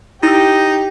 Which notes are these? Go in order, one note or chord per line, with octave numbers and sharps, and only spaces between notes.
D#4 E4 G4 E6